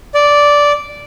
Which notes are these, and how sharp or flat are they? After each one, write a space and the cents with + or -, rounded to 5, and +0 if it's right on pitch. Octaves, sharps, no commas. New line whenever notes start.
D5 -10